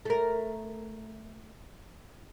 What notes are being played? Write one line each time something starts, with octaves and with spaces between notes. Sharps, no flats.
A3 A#4